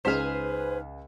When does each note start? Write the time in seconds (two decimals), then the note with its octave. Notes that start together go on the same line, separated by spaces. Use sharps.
0.05 C#2 D#4 G#4 B4 C5 F6 B6 E7